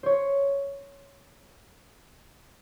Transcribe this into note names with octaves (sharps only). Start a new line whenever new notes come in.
C5 C#5